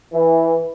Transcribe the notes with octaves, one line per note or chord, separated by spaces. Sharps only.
E3